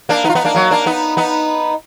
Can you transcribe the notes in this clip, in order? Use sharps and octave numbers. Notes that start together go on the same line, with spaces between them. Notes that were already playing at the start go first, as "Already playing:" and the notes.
A#3 D4
B3 D#4
F4
B3 D#4
A#3 D4
F#3 A#3
A#3 D4
B3 D#4
B3 D#4